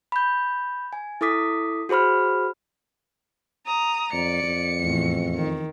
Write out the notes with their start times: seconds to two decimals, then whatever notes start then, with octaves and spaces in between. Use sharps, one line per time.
0.12 B5 G6
0.93 G#5
1.21 E4 A4 D6 D#6 B6
1.89 F#4 G#4 C5 B5 F6
3.66 A#5 D#6
4.13 F2 D5 C#7
4.43 F2
4.81 E2 A2
5.35 D#3